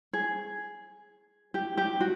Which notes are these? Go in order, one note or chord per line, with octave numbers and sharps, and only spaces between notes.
G#4
G4
G4
F#4